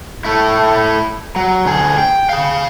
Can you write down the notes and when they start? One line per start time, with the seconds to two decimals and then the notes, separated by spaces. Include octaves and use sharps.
0.25 A3 E4
1.36 F#3
1.65 D2 G#4
1.98 G5
2.29 G#4 F5